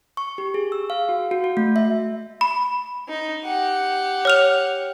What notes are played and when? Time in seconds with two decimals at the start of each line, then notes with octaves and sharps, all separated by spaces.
0.17 C#6
0.38 G4
0.54 G#4
0.72 E6
0.90 F5
1.09 F#4
1.31 F#4
1.44 F#4
1.57 A3
1.76 E5
2.41 B5
3.09 D#4
3.45 G4 F#5
4.25 C#5 F6 F7